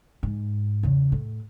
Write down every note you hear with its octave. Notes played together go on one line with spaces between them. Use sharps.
G#2
E2 C#3
A2